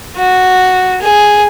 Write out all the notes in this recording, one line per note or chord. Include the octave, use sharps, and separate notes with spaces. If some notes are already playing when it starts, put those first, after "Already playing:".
F#4
G#4